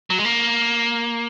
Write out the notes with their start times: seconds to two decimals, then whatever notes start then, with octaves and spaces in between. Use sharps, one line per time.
0.10 F#3
0.18 G#3
0.25 A#3